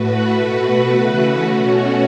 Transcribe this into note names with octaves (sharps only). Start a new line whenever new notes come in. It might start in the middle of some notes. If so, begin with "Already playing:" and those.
Already playing: A2 A3 F#4 B4
B2 A3 F#4 B4
C#3 E3 A3
B2 A3 C#4 F#4